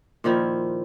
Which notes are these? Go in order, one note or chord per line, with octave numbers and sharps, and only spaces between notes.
A#2 D#3 F3 E4